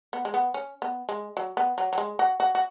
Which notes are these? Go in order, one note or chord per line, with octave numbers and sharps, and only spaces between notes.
B3
G#3
B3
C#4
B3
G#3
F#3
B3
F#3
F#3
G#3
F#4
F#4
F#4